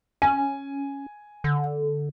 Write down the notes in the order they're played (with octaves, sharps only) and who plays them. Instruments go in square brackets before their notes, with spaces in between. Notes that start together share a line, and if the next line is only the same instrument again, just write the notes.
[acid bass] C#4 [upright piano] G#5
[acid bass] D3